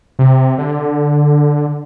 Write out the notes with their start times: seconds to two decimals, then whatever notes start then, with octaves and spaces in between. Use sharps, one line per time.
0.19 C3
0.58 D3